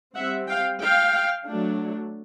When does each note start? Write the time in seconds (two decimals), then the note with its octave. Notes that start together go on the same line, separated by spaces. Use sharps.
0.15 G3 C4 E5 F#5
0.48 F5 G5
0.81 F5 G5
1.47 F#3 A3 D4